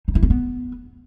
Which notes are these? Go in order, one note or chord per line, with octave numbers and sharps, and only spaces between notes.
D#4
E4
C4
B3